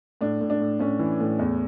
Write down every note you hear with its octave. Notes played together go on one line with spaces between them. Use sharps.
A2 D4
A2
D4
A2
A2 C#4
E3
A2
E2